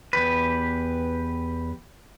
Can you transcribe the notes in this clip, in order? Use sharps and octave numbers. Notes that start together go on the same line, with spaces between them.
E2 G4 B4